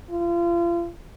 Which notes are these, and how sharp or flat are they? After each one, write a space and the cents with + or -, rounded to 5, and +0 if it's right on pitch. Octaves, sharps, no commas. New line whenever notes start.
F4 -35